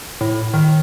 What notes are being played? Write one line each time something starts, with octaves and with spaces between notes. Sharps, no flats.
A2
D#3